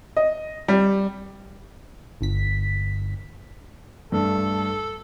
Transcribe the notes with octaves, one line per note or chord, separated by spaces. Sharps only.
D#5
G3
G1 B6
G2 A3 A4